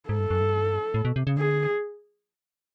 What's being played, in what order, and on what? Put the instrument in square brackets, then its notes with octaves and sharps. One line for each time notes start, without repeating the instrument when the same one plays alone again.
[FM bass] G#2 [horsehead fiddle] A4
[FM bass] G2
F#2
G2
A2
B2
C3
C#3
[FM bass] D3 [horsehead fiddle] G#4